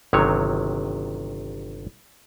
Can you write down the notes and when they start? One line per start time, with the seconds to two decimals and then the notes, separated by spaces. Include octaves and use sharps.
0.13 G1 C3 D#3 F#3 C#5